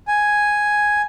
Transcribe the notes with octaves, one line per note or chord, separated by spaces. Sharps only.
G#5